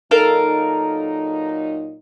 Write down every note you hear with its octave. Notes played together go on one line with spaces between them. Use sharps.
A#2 F#3 D#4 A4 A#4 F5